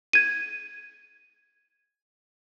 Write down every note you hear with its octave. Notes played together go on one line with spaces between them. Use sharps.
G#6 D#7